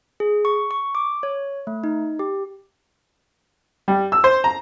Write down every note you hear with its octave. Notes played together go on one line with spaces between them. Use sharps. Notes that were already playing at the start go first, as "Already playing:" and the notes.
G#4
C#6
C#6
D6
C#5
A3
D#4
G4
G3
E6
C5
A#5